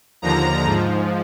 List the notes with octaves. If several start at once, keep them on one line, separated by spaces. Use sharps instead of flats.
D#2 D3 F3 A#5
G#2 F3